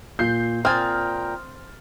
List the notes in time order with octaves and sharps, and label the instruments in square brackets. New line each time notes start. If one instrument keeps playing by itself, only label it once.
[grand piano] A#2 [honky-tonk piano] G6 C7
[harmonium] A#2 G5 A#5 [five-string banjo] C4 G#5 [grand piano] D#6 A6 [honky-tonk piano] F6